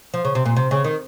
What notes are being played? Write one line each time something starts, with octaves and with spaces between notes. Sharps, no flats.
F3
C#3
C3
A#2
C3
C#3
D#3